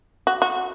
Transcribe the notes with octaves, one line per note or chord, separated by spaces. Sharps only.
F#4
F#4